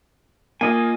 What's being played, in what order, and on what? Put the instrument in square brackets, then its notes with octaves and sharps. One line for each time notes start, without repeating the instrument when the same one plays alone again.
[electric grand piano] A#3 [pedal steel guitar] F4 D#5 G#5